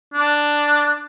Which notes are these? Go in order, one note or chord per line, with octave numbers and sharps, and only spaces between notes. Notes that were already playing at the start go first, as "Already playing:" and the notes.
D4